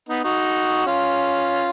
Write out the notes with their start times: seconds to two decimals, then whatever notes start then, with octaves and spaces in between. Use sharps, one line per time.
0.09 B3 D#4
0.24 D#4 F#4
0.86 C#4 F4